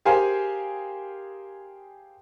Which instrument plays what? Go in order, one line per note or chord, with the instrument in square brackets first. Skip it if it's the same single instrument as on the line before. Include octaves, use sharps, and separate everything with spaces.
[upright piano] G4 G#4 A#4 C5 F5 G#5